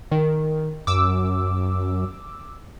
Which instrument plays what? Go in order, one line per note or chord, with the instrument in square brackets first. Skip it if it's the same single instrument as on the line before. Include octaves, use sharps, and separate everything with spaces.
[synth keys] D#3
[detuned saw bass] F#2 [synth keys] D6 E6